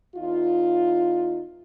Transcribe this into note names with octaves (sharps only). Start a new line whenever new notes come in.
E2 D#4 F4